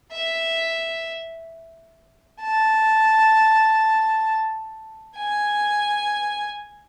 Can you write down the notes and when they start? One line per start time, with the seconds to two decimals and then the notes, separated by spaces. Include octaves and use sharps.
0.13 E5
2.42 A5
5.16 G#5